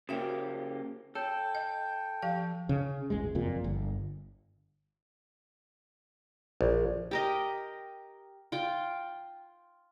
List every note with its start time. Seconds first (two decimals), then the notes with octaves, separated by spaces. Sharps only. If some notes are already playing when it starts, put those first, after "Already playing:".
0.09 C#3 A#3 F#4 G4 E5 G5
1.15 A4 C#5 G5
1.55 D#5
2.22 F3 G4 F5
2.69 C#3
3.10 D#1 A1 G#3
3.35 F#1 F2 A#2
3.64 G1
6.61 A#1
7.11 G4 A#4 D#5
8.52 F4 G5